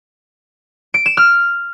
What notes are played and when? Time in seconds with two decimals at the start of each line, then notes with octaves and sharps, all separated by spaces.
0.94 D7
1.06 E7
1.17 F6